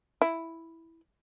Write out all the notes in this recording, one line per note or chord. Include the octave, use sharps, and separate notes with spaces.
E4